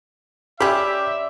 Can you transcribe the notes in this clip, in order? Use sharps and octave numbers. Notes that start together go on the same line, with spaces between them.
C#4 G4 D5 E5 B5 C6 D6